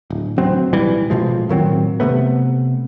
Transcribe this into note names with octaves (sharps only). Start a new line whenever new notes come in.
D1
A1 D2 F#3 C4
D1 B1 E3 G3
A1 B2 F3 G#3
A2 D#3 F#3 C4
C3 F#3 A3 B3